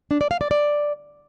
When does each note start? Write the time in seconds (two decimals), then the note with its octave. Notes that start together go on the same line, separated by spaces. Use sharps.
0.11 D4
0.21 D5
0.31 F5
0.41 D5
0.51 D5